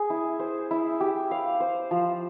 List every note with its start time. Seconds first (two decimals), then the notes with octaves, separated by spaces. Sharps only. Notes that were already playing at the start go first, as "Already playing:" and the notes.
Already playing: G#4
0.10 E4
0.39 C5
0.71 E4
1.00 G4
1.31 F5
1.60 C5
1.91 F3